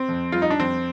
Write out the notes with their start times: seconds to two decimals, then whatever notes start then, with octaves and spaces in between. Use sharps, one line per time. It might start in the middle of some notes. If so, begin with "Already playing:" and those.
Already playing: C4
0.09 F2
0.32 G3 F4
0.42 D#4
0.50 D4
0.59 F2 C4